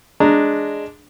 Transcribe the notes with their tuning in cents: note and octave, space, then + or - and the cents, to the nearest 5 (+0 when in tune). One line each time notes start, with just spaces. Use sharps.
G#3 +0 D4 +0 A#5 -10